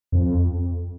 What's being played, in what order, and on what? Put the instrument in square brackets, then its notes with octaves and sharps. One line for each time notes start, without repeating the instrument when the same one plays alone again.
[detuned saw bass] F2